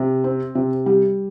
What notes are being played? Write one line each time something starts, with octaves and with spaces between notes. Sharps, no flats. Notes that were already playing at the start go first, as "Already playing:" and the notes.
Already playing: C3
C4
C3
G3